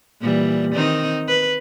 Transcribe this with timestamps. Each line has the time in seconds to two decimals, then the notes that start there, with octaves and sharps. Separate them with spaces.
0.20 A#2 E3 G3
0.75 D#3 C4 D#4
1.28 B4